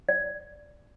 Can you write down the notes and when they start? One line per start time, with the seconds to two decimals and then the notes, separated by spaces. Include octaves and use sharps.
0.09 D5